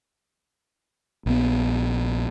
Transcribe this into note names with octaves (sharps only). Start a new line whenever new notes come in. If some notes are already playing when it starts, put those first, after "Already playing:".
A#1 B3